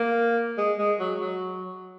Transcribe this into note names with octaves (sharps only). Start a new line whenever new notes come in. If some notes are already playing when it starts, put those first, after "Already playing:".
Already playing: A#3
G#3
G#3
F#3
F#3